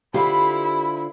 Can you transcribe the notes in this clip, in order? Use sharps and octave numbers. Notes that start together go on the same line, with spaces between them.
D3 E4 F4 G4 C5 F5 B5